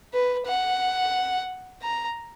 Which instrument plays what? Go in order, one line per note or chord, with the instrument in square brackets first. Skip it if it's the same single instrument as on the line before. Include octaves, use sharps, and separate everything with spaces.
[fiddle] B4
F#5
A#5